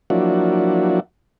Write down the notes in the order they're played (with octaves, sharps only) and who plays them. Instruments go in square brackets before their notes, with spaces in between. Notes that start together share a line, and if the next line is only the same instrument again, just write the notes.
[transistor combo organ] F3 F#3 A#3 D4 E4 F#4